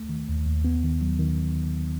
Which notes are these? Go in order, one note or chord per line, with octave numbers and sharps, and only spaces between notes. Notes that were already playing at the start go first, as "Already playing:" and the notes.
Already playing: A3
D#3
D#2
D#2
B3
D#3
F#3
D#3